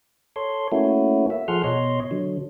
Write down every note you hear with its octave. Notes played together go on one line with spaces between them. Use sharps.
A4 C#5 C6
A3 A#3 C#4 E4 F#4
E5
F3 G#4 A4 F#5 C6 F6
B2 C#5 D#5 C6
D3 F#3